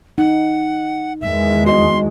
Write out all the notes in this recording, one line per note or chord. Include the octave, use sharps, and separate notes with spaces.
D#4 F#5
E2 D#3 G#3 E5
F#4 D#5 C6